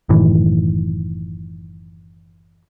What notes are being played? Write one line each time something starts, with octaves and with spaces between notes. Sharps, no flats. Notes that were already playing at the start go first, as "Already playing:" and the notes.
F#1 A2 D#3 E3